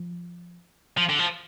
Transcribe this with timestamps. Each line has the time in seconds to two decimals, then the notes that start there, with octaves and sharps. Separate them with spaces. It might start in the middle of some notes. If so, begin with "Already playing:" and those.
Already playing: F3
0.97 F3
1.09 D3
1.19 F3